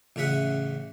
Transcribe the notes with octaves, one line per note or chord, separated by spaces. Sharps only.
A1 C#3 G#4 E5 F#5